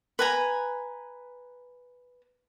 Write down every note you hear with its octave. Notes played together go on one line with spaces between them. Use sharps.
B4 G#5 A#5